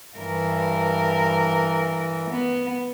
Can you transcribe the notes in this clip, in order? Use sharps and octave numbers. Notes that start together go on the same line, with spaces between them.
G2 E3 A#4
B3